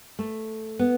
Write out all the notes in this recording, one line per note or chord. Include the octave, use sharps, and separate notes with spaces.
A3
B3